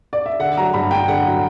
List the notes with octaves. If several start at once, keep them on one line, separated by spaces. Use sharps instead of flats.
D5
E5
D3 F#5
F#3 A#5
G2 B5
G2 G5
D3 F#5
F#3